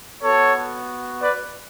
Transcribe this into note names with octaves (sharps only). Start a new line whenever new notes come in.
B3 F#4 A4 C#5
B4 D5